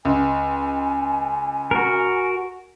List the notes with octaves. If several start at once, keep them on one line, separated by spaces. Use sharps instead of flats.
C#2 G#5
F#4 A#4